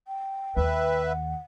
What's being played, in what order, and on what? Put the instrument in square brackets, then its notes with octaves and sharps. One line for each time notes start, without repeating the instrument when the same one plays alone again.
[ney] G5
[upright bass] D#2 [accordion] B4 E5
[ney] F#5